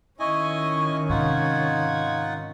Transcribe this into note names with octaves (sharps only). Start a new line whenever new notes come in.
D#3 C#4 E4 D#5 G#5 C#6
G#2 C3 D#4 F4 F#5 G#6